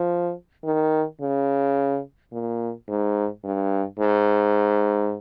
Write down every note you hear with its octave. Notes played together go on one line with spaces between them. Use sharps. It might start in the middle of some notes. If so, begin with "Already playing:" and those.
Already playing: F3
D#3
C#3
A#2
G#2
G2
G#2